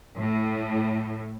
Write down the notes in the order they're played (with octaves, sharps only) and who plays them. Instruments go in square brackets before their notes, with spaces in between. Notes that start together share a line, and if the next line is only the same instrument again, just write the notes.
[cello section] A2